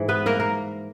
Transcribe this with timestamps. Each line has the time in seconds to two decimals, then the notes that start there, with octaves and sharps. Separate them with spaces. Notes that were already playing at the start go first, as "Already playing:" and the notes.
Already playing: G#2 E3
0.08 B3 B4
0.26 A#3 A#4
0.40 A#3 A#4